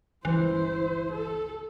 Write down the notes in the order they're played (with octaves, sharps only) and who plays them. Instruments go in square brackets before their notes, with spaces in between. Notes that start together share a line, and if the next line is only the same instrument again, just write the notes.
[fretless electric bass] G1 C#2 [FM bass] E3 [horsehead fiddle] E4 C5
[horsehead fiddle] A4